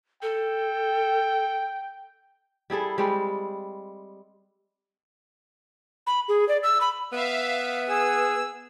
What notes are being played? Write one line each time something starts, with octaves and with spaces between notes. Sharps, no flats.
A4 G5
G3 E4 G#4 A4
G3 G#3 C4
B5
G#4
D5
E6
B5
B3 E5 F5
G#4 E6